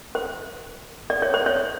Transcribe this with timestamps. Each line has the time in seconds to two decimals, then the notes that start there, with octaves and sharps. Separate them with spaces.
0.15 C5
1.10 D5
1.22 C#5
1.34 C5
1.46 C#5